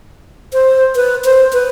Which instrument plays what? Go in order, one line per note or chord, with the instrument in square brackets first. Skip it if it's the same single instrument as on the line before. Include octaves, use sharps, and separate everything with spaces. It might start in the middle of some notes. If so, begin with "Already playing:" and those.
[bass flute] C5
B4
C5
B4